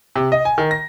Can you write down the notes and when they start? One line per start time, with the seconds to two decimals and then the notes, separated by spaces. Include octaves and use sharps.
0.16 C3
0.32 D#5
0.45 G#5
0.58 D#3
0.71 A#6